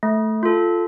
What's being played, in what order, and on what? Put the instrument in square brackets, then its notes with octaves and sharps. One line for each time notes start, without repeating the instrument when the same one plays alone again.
[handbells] A3
F4 A4